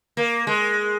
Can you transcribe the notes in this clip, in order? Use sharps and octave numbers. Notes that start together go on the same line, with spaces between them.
A#3
G#3